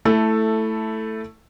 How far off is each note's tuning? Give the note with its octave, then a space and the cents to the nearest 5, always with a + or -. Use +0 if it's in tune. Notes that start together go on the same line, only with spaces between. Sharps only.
A3 +5 E4 +0 A4 +0